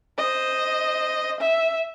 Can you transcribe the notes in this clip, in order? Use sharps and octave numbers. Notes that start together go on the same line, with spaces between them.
C5 D#5
E5